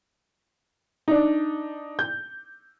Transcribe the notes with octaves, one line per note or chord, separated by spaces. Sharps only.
D4 D#4
G6